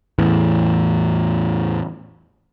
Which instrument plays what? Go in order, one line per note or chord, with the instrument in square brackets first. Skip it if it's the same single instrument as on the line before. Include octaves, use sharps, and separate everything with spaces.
[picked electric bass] E2 A2 E3